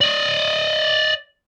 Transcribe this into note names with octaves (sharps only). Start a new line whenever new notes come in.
D5 D#5